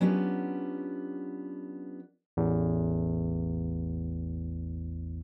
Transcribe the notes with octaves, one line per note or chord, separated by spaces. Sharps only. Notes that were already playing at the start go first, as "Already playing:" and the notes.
F#3 B3 C#4 D4 F4 G4
A1 E2